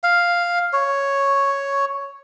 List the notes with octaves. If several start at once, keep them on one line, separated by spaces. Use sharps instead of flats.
F5
C#5